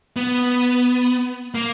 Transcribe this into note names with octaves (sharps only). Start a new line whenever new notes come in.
B3
A#3